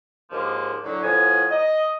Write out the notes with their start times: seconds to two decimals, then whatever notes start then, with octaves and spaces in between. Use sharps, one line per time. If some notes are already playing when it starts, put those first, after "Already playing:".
0.30 D#2 G#2 D3 F3 A#3
0.84 A2 D3 F#3
1.02 A2 F3 B3 G#5
1.51 D#5